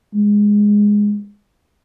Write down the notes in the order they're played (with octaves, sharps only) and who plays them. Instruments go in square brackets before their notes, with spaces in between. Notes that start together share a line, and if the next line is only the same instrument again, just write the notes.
[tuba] G#3